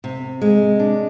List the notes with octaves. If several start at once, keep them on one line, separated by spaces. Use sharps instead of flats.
C3
G#3
D4